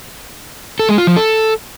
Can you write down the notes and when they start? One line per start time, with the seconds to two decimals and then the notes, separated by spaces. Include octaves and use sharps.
0.79 A4
0.89 G#3
0.98 F4
1.07 F3
1.16 A4